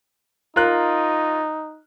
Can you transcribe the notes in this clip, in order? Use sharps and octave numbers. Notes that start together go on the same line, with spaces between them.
D#4 F4 A#4 F#6